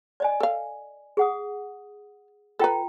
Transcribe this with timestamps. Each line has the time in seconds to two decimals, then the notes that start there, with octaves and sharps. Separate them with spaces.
0.20 D5 D#5 G#5
0.40 A4 F5
1.17 G#4 F#5 D#6
2.59 F4 A4 B4 G5 A#5